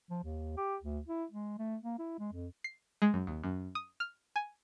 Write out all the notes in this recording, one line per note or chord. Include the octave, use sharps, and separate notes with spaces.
F3
D#2
G4
D2
E4
G#3
A3
A#3
E4
G#3
F2
C7
G#3
F#2
D#2
F#2
D#6
F6
G#5